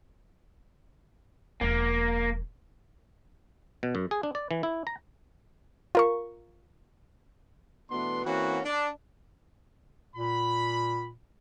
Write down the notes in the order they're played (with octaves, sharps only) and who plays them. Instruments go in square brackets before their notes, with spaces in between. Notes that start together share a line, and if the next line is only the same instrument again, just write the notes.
[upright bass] E1 F3 [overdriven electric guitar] A#3
[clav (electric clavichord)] B2
F#2
G#4
D4
D5
E3
E4
A#5
[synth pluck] F4 A#4 C#6
[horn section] B2 E3 A3 B3 D4 C6
E3 A#3 C4 C#4 F#4
D4
[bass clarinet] A#2 [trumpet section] B5